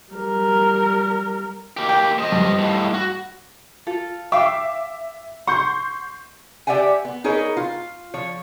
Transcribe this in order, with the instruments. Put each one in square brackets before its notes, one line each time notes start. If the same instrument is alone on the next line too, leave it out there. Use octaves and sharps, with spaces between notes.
[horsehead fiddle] G3 A#4
[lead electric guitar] A#3 G4
[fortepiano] G5
[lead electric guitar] F3 D#5
[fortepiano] G2
[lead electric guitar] D#2 A2
F#4
[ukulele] F4 A4
[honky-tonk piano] E5 D6 [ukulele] F5 G5
[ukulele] F#5 [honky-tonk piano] C6 C#6 G6
[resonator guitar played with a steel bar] G4 D5 E5 F#5 G#5
B3
D#4 G#4 A#4 B4 C#5
F4
F3 C#5